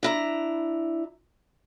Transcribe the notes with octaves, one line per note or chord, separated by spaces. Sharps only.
D4 E4 A#5